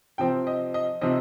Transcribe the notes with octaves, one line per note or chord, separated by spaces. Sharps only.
C3 F3 C4 G5
D#5
D#5
C3 F3 C4 D#5